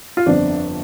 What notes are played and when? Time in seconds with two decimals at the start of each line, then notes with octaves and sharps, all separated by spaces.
0.17 F4
0.26 G1 F2 D3 F3 D4